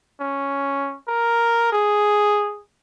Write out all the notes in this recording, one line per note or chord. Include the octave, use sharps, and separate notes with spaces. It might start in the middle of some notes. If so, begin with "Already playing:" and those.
C#4
A#4
G#4